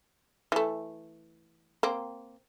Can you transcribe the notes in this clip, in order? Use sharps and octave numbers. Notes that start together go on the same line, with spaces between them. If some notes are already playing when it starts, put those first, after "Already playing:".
E3 A3
A#3 C4